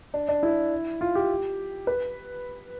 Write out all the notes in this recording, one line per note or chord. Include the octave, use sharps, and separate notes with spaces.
D4
D4
E4
F4
G4
B4